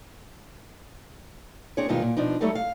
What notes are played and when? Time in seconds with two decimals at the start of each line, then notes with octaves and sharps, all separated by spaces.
1.77 C4 D4 G#4 C#5
1.88 G2 B2 D#3 G#3 D#4 F4
2.02 A#2
2.17 B2 F3 D4 D#4
2.40 F#3 G3 A3 D#4 A4 C#5
2.55 F5